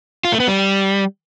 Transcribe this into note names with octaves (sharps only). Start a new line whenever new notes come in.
F4
A3
B3
G3